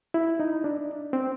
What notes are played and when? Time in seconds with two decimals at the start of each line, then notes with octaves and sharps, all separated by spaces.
0.14 E4
0.40 D#4
0.64 D4
1.13 C4